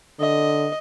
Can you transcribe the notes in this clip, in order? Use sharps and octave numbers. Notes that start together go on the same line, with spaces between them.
D3 D#5